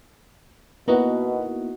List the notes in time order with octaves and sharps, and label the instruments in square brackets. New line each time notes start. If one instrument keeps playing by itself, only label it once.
[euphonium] B2 [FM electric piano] A#3 B3 E4 [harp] D#4 F#4 [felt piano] B4 F#5